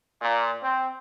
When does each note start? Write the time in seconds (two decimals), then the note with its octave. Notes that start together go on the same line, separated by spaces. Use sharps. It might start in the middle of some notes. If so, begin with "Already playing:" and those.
0.21 A#2
0.63 C4